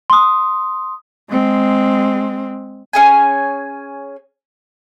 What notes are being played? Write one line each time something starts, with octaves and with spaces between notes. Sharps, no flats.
C6 D#6
G#3 C4
C#4 G#4 G#5